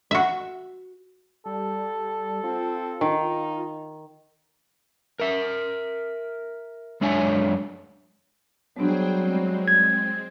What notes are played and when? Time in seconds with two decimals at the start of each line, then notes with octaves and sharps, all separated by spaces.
0.11 F#4 E5
1.46 G3 A4
2.44 C4 F4
3.01 D#3 D#4
5.20 A#4 E5
7.01 F#2 G#3 D4 C#5 E5 G#5
8.77 F#3 G3 B3 D4 G#4 C5 G5
9.19 G#3 C4
9.68 G#6